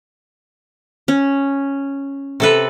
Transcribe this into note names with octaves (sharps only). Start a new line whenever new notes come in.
C#4
C3 A4 B4